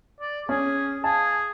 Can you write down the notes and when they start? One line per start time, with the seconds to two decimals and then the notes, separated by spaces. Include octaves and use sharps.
0.20 D5
0.49 C#4 G#4
1.04 G#4 F5 G#5 A5